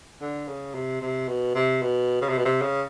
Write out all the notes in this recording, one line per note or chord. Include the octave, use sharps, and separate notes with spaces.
D3
C#3
C3
C3
B2
C3
B2
C#3
C3
B2
C3
C#3